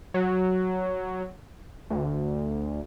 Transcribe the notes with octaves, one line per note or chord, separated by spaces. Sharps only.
F#3
D2